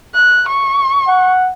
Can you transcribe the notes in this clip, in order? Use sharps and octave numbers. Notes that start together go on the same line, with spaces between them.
F#6
C#6
F#5